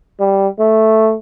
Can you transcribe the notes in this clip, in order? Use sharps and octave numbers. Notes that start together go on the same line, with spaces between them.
G3
A3